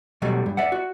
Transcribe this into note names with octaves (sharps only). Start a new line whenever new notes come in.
B2 F#3 G3 A3
G2
D5 E5 F#5
F#4